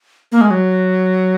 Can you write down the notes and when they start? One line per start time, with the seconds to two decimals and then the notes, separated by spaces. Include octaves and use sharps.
0.32 A#3
0.41 G#3
0.51 F#3